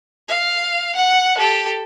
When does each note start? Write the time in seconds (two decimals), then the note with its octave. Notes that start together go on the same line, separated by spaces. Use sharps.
0.28 F5
0.95 F#5
1.37 G4 A4